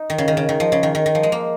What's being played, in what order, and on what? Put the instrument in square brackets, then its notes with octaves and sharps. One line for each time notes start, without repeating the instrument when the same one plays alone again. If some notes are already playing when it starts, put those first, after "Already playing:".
Already playing: [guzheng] D#4
D#3
C#3
D#3
C#3
D#3
F3
C#3
D#3
D#3
D#3
F3
G#3
A#3